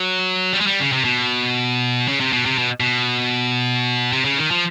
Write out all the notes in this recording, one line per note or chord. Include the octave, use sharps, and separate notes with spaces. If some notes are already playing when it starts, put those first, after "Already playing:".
Already playing: F#3
G3
G#3
G3
C#3
C3
B2
C#3
C3
B2
C3
B2
B2
C3
C#3
D#3
F3